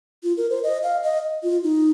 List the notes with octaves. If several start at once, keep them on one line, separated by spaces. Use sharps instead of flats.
F4
A#4
C5
D#5
F5
D#5
F4
D#4